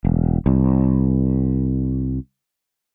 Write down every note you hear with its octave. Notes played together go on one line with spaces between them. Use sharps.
E1
C2